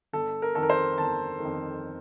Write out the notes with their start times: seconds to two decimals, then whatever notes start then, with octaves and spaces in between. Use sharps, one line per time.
0.13 G1 A4
0.42 A#4
0.55 F2 D#3 A4
0.63 A#4
0.70 C5
0.98 G1 A5
1.40 F2 D#3